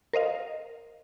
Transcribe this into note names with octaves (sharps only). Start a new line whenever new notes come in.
A#4 C5 D#5 F5